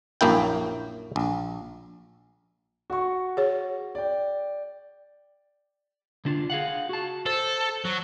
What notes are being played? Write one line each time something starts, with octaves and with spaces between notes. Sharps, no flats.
A#1 F#2 A#3 E4 G5
A#1
F#4 C#6
G#4 C#5
D5 G5
D3 D4 F4
G#4 F5 F#5
F#4 A5
A4 C5
F#3